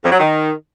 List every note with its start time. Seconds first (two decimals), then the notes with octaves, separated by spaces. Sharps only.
0.04 F2
0.12 F#3
0.20 D#3